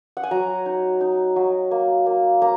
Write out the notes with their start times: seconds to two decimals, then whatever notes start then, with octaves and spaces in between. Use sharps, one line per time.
0.17 F#5
0.23 G#5
0.31 F#3 A#5
0.66 D#4
1.01 D#4
1.36 F#3
1.71 A#3
2.06 A#3
2.42 A#3 A#5